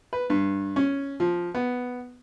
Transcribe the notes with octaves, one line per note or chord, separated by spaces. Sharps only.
B4
G2
C#4
F3
B3